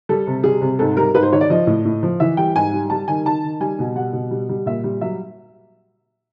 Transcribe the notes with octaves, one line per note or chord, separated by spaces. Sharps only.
G3 A4
C3
G3 G#4
C3
G#2 A4
G3 A#4
G#2 B4
C5
D#3 C#5
D5
F3 D#5
A2
A2
F3
E3 E5
G3 G5
G#2 G#5
G3
G3 A5
D#3 G#5
D#3 A5
D#3
G3 G#5
B2
G3 F#5
B2
G3
G3
A#2 E5
G3
F#3 E5